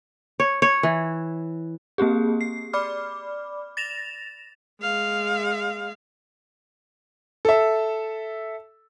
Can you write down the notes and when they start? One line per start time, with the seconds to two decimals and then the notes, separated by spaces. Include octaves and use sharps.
0.40 C#5
0.62 C#5
0.83 E3
1.98 A#3 C4 G4 G#4
2.41 C7
2.73 D5 B5 D6 F6
3.77 A6 A#6 E7 F7
4.81 G#3 F5
7.45 A4 E5